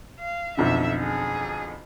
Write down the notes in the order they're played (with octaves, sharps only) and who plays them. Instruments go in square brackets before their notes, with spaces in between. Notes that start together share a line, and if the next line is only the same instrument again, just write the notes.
[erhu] F5
[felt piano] B1 F2 D3 [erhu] E5
[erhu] G#4